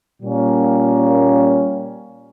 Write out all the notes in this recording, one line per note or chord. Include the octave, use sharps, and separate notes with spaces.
A#2 G3 A#3 C#4